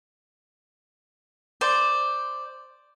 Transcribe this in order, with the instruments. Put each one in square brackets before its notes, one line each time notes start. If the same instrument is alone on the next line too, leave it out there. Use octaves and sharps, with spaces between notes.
[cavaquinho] C5 D5